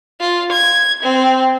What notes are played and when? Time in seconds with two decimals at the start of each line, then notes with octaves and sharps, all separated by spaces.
0.20 F4
0.52 G#6
1.03 C4